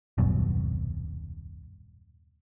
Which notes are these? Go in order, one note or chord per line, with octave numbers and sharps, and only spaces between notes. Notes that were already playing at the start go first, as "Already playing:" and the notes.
D#1 C2 F#2 B2